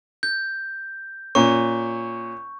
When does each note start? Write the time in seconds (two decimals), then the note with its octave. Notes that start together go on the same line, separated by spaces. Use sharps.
0.23 G6
1.35 A#2 C#4 C#6